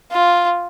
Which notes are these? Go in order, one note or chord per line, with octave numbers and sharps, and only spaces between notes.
F4